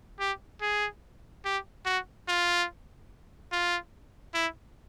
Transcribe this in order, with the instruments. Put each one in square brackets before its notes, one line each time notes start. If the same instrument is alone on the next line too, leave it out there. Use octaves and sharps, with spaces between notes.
[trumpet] G4
G#4
G4
F#4
F4
F4
E4